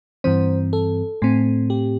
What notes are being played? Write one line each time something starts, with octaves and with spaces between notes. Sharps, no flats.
G2 E3 C4 C5
A4
A2 A3 C4
G4